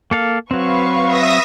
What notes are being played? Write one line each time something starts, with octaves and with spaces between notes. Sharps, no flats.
A#3 A4 F5
F#3 C4 B4 F5 C#6
E5 D#6 A#6